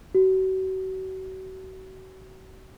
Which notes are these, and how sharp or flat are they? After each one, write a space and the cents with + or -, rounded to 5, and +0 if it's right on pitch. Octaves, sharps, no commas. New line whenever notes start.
F#4 +35